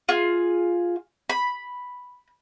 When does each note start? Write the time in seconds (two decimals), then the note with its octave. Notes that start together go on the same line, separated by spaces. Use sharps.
0.09 F4 G#4
1.30 B5